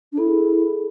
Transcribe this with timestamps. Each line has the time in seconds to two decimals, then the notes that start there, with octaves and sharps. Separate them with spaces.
0.12 D4
0.18 E4 A4
0.28 G#4